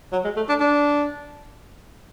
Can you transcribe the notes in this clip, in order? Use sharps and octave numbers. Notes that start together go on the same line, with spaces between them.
F#3
G#3
A3
D4
D4